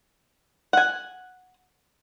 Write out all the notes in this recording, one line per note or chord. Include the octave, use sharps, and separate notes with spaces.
F#5 G#5